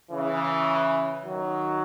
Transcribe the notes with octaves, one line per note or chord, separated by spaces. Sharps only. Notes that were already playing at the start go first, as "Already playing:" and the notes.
C#3 E3
D#3 F#3